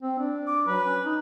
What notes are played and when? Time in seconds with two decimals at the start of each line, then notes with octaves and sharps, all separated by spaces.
0.03 C4
0.19 D4
0.47 D6
0.67 F#3 B4
0.85 C#4
1.05 D#4